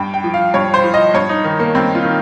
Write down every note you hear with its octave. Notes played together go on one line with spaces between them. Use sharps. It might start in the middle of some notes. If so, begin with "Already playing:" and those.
Already playing: G2 G5
G5
F3
F5
G2 C#5
C5
F3
D#5
G2 C#5
D#4
D#3
A#3
G2 C4
F4
D#3